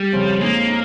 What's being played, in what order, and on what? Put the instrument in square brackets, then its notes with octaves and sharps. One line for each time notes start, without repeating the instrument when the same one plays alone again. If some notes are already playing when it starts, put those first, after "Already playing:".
Already playing: [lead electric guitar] G3
[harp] F2 C#3 F3
[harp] A#2 G#3 D#4 [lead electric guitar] A#3
[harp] D#4